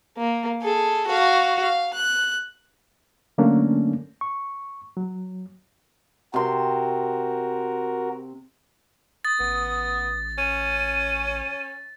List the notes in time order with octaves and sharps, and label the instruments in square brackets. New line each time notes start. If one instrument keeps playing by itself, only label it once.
[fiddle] A#3
G#4 A4
F#4 F5
F5
F#6
[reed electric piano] D3 F#3 A3 A#3 C#4 D4
C#6
F#3
[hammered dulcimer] C3 C6 [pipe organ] F#4 A#4
[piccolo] D#6 [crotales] A6
[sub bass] A1 [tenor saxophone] B3
[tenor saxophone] C#4 [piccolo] D#7